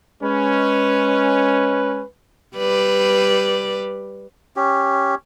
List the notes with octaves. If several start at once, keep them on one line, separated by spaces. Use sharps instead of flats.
G#3 C#4 B4
G3 B4 D5
C#4 G4